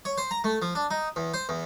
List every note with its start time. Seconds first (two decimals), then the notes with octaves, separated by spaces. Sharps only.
0.05 C#5
0.18 C5
0.31 A#5
0.44 A3
0.62 F3
0.75 D4
0.91 D#4
1.16 E2
1.34 C5
1.49 E2